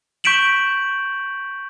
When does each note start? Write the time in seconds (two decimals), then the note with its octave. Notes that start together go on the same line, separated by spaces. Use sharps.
0.24 C#6 G6 B6 D7 E7 F#7